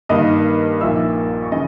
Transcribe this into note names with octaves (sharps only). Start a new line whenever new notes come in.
G2 D#3 A#3 D#4 D#5 D#6
A#1 A#2 A#3 D#4 E5 E6
C#6
C#3 E3 D#5 D#6